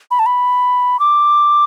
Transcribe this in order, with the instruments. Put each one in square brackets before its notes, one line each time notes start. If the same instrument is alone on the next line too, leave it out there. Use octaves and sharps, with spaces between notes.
[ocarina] B5
A5
B5
D6